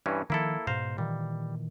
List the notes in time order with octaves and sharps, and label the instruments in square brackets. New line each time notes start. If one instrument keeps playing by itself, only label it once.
[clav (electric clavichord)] G2 E3 C#4
[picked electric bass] D#3 F3 [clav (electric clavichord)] A#3 E4 A4
[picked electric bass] G#2 B2 [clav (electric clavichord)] C5 F5 A#5
[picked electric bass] A#2 D#3 E3 [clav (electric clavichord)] G3